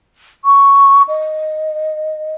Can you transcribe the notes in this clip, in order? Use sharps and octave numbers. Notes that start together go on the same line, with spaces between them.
C#6
D#5